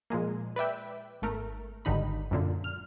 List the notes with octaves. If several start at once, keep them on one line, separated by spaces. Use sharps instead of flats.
A#2 F3 G#3 A#3
B4 D5 E5 G5
G#1 A3 A#4
G#1 G2 D3 D#4 B5
F#2 A#2 D3
F6